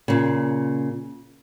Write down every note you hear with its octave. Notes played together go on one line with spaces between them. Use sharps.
A#2 C#3